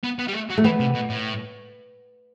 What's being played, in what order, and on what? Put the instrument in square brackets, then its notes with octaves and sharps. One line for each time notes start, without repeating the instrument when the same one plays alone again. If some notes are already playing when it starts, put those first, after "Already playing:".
[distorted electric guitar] B3
B3
G3
A3
F#3
[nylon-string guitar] A3
[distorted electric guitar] E3 [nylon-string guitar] B3
[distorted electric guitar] C3
B2
A2